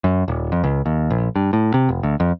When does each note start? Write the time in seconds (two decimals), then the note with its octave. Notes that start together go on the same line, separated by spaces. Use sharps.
0.04 F#2
0.28 D#1
0.52 F2
0.64 C#2
0.86 D#2
1.10 A#1
1.36 G2
1.53 A2
1.74 C3
1.89 F1
2.03 D2
2.20 F2